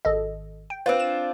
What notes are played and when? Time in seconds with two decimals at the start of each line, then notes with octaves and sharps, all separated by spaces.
0.05 G#1 A4 D#5
0.70 G5
0.86 C4 D4 F4 B4
1.00 E7